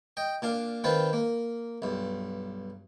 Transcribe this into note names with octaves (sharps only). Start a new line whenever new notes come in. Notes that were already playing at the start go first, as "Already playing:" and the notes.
D#5 G5
A#2 D4 F5
D#3 C4 F4 B4 C5
A#3
B1 G2